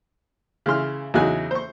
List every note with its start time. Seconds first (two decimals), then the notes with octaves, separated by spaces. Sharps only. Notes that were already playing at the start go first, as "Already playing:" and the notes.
0.66 C#3 E3 C6 F6
1.14 E2 C#3 F#3 D#4 G#5 F#6
1.51 C5 C#6